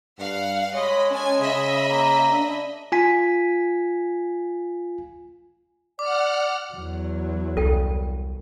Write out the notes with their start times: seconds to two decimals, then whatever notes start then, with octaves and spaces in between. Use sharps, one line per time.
0.19 G2 F5 F#5
0.74 G#3 C#5 D#5 B5
1.10 C#4 G#5 A5
1.40 C#3 D#5 E5 B5
1.89 A#3
2.31 D4
2.92 F4 G#5 B6
5.99 D5 F#5 D6 F6
6.74 E2 F#3
7.57 C2 A4 G5